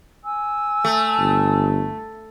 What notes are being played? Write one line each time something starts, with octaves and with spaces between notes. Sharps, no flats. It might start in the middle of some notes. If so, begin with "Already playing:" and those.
G#5 E6
A3
G1